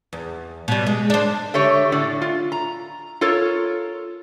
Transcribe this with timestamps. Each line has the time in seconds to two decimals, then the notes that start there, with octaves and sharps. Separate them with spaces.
0.13 E2
0.68 B2 G3
0.86 G#3
1.10 D4 C5
1.54 D3 A3 G4 C#5
1.92 A2 D3 D5
2.21 F4
2.52 A#5
3.21 F4 A4 A#4 C#5